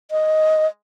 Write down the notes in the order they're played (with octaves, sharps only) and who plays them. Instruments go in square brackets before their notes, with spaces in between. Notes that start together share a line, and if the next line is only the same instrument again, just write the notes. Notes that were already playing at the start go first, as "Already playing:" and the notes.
[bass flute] D#5